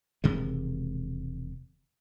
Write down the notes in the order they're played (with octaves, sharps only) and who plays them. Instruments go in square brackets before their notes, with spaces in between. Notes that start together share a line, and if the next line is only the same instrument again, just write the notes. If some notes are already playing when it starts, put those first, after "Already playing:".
[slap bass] E1 C3 D#3 G#3